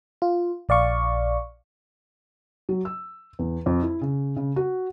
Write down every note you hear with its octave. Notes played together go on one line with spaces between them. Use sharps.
F4
A#1 D5 F5 C#6
F#3
E6
E2
F2
E4
C#3
C#3
F#4